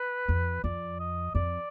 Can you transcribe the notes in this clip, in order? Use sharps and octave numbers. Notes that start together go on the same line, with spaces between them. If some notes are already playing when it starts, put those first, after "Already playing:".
Already playing: B4
F2
F2 D5
D#5
F2 D5